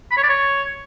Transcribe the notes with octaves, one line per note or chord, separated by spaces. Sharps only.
B5
C#5
D5
C#5